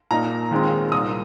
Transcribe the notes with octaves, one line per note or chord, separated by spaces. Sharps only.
A#2 A#3 D#4 A#5
D#2 D#3 G#3 C4 F4
C2 A#2 A#3 D#6